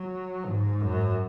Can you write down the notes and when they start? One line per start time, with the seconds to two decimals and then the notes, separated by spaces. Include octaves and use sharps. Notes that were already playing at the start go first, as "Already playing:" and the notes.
Already playing: F#3
0.46 G#2
0.81 F#2